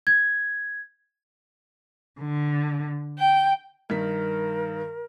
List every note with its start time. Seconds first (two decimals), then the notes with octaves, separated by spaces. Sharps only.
0.07 G#6
2.20 D3
3.18 G5
3.90 G2 D#3 A#4 B6